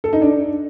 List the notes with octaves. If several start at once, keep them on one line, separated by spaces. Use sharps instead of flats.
A4
D#4
D4